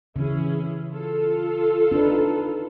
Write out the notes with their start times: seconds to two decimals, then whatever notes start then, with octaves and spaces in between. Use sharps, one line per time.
0.16 C#3 E3 C#4 E4 G#4
0.89 F4 A4
1.92 D4 D#4 B4